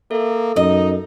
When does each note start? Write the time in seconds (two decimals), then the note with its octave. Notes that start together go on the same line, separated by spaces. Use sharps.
0.11 A#3 A4 E5
0.56 F#2 D#4 D#5